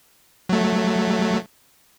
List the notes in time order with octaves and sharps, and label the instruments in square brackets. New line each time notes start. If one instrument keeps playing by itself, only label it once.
[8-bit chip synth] F#3 A3